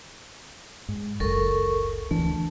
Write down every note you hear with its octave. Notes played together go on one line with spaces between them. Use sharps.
G#2
F#1 C#2 A4 A#4 C#6
D2 E3 A3 D4